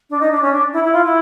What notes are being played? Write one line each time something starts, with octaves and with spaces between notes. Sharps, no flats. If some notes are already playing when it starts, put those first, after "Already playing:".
D4
D#4
D4
C#4
D4
E4
E4
F4
E4